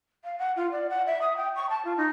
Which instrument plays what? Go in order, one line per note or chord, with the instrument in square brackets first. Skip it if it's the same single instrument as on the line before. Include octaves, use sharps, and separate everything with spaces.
[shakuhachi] F5
F#5
F4
D5
F#5
E5
D#6
G5
C#6
A5
F4
D#4